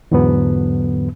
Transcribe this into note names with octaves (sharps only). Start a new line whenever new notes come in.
E2 G#2 D3 F#3 B3